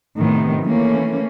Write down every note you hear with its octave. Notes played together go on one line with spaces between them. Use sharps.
A2 C3 D#3 B3
E3 A3 A#3 C#4